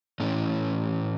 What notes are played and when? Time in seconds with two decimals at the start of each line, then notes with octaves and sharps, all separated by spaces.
0.20 A2 E3 C#4